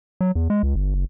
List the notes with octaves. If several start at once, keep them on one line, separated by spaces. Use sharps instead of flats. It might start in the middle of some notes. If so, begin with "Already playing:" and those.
F#3
E2
G#3
C#2
G1
F#1